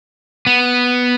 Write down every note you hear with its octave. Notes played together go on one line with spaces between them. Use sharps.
B3